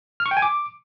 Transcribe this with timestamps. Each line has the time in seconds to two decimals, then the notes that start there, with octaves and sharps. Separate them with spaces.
0.20 F6
0.26 C#6
0.31 G5
0.37 G#5
0.42 D6